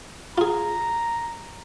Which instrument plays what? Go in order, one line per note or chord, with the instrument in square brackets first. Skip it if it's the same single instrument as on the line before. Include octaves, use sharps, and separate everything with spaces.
[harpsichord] F4 G#4 [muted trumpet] A#5